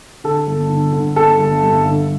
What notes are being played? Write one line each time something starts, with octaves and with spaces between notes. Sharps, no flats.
D3 A4
G1
D3
D3
G1 A4
G1
G2
D3